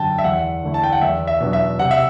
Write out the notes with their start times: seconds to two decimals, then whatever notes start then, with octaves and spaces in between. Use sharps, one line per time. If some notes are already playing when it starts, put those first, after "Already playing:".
Already playing: F#2 D3 F#3 G5 A5
0.18 E5
0.24 E2 F#5
0.63 D3 A3 E4
0.74 A5
0.83 G5
0.92 F#5
1.02 E2 E5
1.27 E5
1.40 B2 F#3 B3 D4
1.53 E5
1.79 C3 F#5
1.91 E5